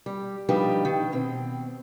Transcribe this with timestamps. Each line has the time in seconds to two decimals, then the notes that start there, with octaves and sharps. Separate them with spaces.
0.06 G3
0.49 F3 G3 D4 D#4 G4 B4
0.85 D#3
1.12 B2 C4